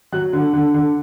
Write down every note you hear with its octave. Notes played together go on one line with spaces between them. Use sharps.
F#3 F#6
D3
D3
D3